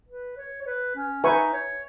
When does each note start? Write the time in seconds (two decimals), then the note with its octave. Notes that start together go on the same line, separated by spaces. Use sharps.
0.09 B4
0.37 C#5
0.62 C#5
0.66 B4
0.96 C#4
1.24 D#4 B4 E5 G#5 C#6
1.53 C#5